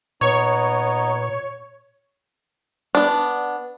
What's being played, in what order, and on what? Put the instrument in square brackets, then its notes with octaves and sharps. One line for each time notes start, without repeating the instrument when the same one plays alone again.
[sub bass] A#2 [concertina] B3 D#4 [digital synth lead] C#5
[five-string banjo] B3 D4